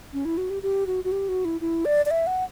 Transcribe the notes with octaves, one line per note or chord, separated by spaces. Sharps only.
C#4
E4
F#4
G4
G4
F#4
F#4
G4
F#4
E4
E4
D5
D5
E5
F#5